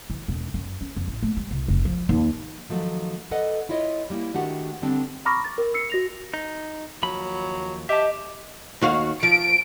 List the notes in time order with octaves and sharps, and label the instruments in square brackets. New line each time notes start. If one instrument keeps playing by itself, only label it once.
[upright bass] E3
E1
F#2
C#4
F2
A1
A3
G3
C2
F1
F3
D#2
[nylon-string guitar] D#3 F3 F#3 A3
A4 B4 D5 D#5 F#5
E4 F4 C#5 D#5
G3 A#3 E4
D#3 A3 D4 F#4 G4 F#5
D3 G3 B3 C4 D4
[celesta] A#5 B5 C#6 D6 F6 A#6
A6
A#4
E6 C7 C#7
F#4 A#6 F7
[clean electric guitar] D#4
[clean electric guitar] D#2 F3 B5 [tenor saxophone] F#3
[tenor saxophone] G4 [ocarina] D#5 [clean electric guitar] E5 A5
[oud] D#2 F#4 F5
[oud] F3 [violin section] D7